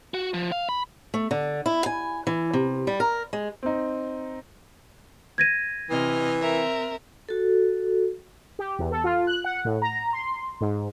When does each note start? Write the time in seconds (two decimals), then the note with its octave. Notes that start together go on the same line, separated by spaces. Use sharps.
0.14 F#4
0.34 F3
0.52 F5
0.69 B5
1.14 A3
1.31 D3
1.66 E4
1.86 G#5
2.27 E3
2.53 C3
2.87 G3
3.00 A#4
3.33 G#3
3.63 C4 D#4
5.38 G#6 A#6 D#7
5.90 C3 E3 D#5 F6
6.40 C4 A#4 E5
7.29 F#4 A4
8.59 G4
8.79 E2
8.91 A4
9.04 F4
9.27 F#6
9.44 F#5
9.65 A2
9.82 A#5
10.13 C6
10.61 G#2